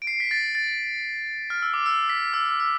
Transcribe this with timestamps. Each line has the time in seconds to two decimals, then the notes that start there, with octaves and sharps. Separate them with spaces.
0.02 D7
0.07 C7
0.20 B6
0.31 A6
0.55 A6
1.50 F6
1.62 E6
1.74 D6
1.86 E6
2.10 B6
2.34 E6
2.45 E6
2.60 E6